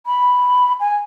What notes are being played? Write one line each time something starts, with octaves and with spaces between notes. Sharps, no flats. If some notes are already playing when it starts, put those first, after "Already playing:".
B5
G#5